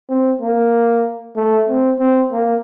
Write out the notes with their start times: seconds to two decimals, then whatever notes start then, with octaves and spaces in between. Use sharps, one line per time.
0.09 C4
0.41 A#3
1.36 A3
1.68 C4
1.99 C4
2.32 A#3